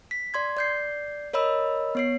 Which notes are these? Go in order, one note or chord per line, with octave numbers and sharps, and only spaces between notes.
B6
D5 C6 G#6
D5 G6 C7
A#4 C#5 D#5 B5 E6
B3 C#5 C7